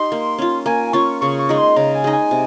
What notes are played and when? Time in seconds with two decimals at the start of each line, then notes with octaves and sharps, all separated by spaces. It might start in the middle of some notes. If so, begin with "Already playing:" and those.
Already playing: D#4 G4 C6
0.12 A#3
0.38 C#4 F4
0.66 A#3 G#5
0.93 C#4 F4 C#6
1.21 C#3 C#6
1.39 C#6
1.49 G#3 D#4
1.58 C6
1.76 C#3 A#5
1.95 G#5
2.04 G#3 D#4
2.13 G#5
2.31 C3